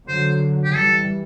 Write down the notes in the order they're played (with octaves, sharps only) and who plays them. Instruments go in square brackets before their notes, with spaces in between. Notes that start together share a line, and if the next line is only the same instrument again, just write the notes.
[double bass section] D3 F#3 [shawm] C5
[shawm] G4
[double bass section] E3 G3 [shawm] A4